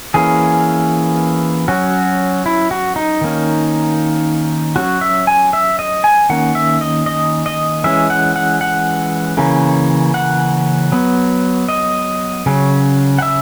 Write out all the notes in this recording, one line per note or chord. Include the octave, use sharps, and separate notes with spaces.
E3 A#3 C#4 G#4
F#3 C#4 F#4
E4
F#4
D#4
D#3 A#3 C#4
F#3 C#4 F#4
E5
G#5
E5
D#5
G#5
D#3 A#3 C#4 F#5
E5
D#5
D#5
D#5
E3 G#3 C#4 E5
F#5
F#5
F#5
C#3 E3 A#3 C#4
F#5
F#3 B3
D#5
C#3 F#3 C#4
F#5
E5